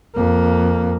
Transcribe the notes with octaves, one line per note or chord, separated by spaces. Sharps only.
F2 A#3